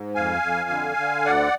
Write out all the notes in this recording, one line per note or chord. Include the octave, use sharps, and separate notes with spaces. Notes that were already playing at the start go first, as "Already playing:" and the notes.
Already playing: G#2
F2 F5 G#5
F2
D3
D3
D2 D5 F#5